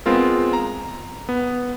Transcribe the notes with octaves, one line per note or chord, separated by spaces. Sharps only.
G#3 B3 C4 F4 A#4
A#5
B3